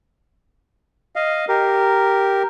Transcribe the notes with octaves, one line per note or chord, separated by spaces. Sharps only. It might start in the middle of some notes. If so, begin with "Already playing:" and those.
D#5 F5
G4 A#4